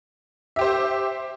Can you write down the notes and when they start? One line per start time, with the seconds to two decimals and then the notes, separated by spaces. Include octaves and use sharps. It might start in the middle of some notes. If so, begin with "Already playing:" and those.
0.56 E5
0.59 G4
0.61 C5